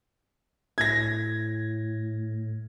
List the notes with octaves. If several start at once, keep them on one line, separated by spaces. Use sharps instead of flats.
A2 G#6 A#6